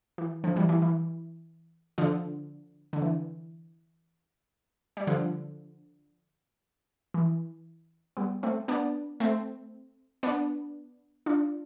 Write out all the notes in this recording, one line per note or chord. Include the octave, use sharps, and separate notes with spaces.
E3
D3 F3
E3 G3
E3
E3
D3 F3
D3
E3
G3
D3 F3
E3
G3 B3
A3 C4
B3 D4
A3 C4
B3 D4
D4 F4